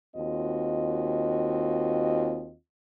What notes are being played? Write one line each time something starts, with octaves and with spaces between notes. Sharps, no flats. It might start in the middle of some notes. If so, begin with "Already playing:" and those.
D#2 C4 F4 F#4 D#5